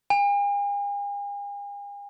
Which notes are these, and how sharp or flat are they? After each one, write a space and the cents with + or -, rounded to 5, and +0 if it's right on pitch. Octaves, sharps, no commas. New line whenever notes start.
G#5 -45